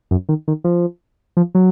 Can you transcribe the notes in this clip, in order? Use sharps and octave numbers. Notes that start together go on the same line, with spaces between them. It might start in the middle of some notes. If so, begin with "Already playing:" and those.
F#2
D#3
D#3
F3
F3
F#3